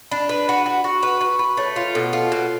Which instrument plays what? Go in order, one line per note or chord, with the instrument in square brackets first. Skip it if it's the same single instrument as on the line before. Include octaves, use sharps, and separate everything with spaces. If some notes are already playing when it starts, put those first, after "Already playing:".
[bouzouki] D4 [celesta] B5
[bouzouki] B4
[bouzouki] F#4 [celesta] B5
[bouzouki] F#4
[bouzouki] F#4 [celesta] C#6
[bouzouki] B4 [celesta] C#6
[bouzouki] B4 [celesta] C#6
[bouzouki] B4 [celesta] B5
[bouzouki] A3 [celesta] C#5
[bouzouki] F4
[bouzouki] B2 [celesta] A4
[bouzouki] F4
B2